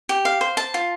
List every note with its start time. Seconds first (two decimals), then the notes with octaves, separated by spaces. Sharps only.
0.09 G4
0.25 F5
0.41 C5
0.57 A5
0.74 F4